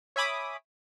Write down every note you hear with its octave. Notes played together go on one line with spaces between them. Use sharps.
C#5 E5 G#5 B5 D6 D#6